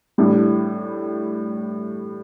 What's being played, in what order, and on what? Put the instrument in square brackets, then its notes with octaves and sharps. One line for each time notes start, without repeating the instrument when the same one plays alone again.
[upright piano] A2 E3 G3 D4